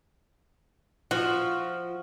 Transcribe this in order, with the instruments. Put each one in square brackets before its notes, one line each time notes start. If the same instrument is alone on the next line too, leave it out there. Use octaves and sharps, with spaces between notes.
[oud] F3 [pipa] F#4